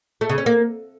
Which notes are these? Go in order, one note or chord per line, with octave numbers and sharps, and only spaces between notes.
A3
C#3
C#4
A#3